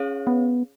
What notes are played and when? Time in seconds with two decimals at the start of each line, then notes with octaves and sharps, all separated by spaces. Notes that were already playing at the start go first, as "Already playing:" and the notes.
Already playing: C#4 G#4 C#5 F5
0.27 B3